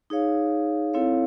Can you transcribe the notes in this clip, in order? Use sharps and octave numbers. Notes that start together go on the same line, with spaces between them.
D#4 G#4 C#5 F5
C4 E4 A4 C#5 F5